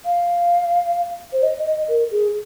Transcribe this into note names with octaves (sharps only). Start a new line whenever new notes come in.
F5
C5
D#5
D#5
A#4
G#4